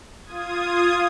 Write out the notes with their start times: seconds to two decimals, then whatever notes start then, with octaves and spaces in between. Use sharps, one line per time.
0.24 F4 D#6 G#6